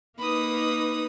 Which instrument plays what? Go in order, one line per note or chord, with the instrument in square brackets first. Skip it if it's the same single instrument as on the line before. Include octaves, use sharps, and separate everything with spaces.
[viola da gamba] A#3 D#4 B4 [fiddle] B5 D#6